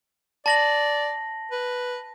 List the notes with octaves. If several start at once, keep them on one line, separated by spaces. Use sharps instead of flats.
D5 A5 A#6 F#7
B4